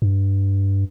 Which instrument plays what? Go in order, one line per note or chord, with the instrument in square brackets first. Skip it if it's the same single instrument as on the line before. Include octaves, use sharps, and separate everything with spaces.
[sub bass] G2